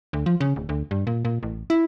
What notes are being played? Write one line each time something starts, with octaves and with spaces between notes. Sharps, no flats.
D2
F3
C#3
D1
D2
G2
A#2
A#2
A1
E4